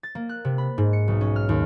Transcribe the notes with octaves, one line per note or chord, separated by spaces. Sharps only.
A6
A#3
F#6
C3
B5
G#2
C#7
B1
C#4
F6
D#2